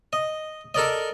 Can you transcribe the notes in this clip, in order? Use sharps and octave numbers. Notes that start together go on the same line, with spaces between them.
D#5
A4 A#4 D5 D#5